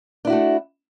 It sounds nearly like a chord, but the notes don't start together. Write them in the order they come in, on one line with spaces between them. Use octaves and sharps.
D4 E4 F#4 A3